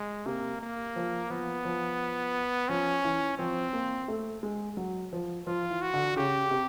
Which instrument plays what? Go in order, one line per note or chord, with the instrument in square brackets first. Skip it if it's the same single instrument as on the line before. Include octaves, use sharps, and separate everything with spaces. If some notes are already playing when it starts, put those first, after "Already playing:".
Already playing: [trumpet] G#3
[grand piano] C3 [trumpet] A#3
[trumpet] A#3
[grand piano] F3
[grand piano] F3 [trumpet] B3
[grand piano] F3
[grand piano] F3 [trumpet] C#4
[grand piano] E3
[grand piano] F3 [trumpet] C4
[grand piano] A#3
A3
G#3
F#3
F3
[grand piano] F3 [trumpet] F4
[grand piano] E3
[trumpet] F#4
[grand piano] D3
[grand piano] C#3 [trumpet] G4
[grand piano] C3